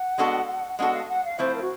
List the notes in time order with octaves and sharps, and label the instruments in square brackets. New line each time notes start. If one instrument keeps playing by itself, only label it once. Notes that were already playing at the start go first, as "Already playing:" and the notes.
Already playing: [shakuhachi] F#5
[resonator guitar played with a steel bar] G#3 B3 D4 F#4 A4
[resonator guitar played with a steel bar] G#3 B3 D4 F#4 A4 [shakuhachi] F#5
[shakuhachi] F5
F#5
F5
[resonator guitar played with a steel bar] F3 A3 C4 E4 [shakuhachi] C5
[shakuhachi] A#4
F#4